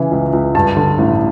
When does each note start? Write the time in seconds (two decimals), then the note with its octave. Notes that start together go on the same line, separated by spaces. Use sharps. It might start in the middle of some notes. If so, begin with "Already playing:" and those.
Already playing: C#3 E3
0.11 C#2
0.33 C#2
0.54 G2 A5
0.77 D3
0.98 A1